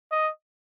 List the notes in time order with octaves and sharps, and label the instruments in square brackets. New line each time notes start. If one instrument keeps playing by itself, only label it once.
[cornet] D#5